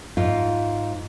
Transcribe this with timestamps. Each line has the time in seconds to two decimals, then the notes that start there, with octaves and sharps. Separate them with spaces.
0.17 G#2 F4